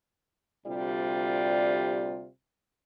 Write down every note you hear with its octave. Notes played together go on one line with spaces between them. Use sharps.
D2 C3 G3 F4 D5